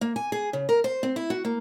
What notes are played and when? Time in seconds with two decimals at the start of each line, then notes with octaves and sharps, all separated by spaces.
0.01 A#3
0.16 G#5
0.32 G#4
0.53 C#3
0.69 A#4
0.84 C5
1.03 C4
1.16 E4
1.30 F#4
1.45 A#3